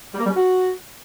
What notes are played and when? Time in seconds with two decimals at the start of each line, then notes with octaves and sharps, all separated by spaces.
0.14 G3
0.19 A#3
0.24 G3
0.29 C#4
0.34 F#4